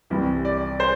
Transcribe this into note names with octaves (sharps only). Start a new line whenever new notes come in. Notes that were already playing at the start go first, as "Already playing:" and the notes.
C2 C3 E3 G3
D5
C5